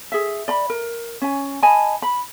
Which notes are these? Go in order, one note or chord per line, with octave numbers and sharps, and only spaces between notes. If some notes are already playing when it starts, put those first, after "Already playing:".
G#4 E5
D5 B5
A#4
C#4 G#5
D#5 G#5 A5 B5
B5